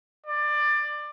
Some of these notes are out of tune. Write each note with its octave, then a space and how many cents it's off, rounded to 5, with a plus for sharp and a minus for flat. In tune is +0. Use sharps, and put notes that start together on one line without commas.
D5 +20